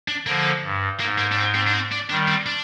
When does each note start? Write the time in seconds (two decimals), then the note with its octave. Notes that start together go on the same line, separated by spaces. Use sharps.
0.08 D4
0.26 D3 F3 A#3
0.63 G2
1.00 G#2 A#3
1.18 A#3
1.32 D4
1.36 C4
1.54 C4
1.67 D4
1.73 C4
1.92 D4
2.09 D#3 G3 D4
2.28 C4
2.46 D4